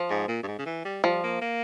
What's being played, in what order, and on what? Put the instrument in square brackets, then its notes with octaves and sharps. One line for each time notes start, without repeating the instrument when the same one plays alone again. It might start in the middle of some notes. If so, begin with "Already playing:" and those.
Already playing: [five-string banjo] F3
[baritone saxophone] G#2
A#2
G2
G#2
C#3
E3
G3
[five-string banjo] F3 [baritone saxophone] G3
[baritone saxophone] A#3
A#3